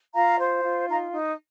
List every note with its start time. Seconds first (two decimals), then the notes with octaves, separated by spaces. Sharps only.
0.15 F4 F5 A#5
0.40 C5
0.64 F4
0.88 D#4 F5 A#5
1.12 D#4